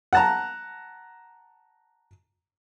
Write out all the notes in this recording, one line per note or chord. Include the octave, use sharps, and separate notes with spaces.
F#5 A5 A#5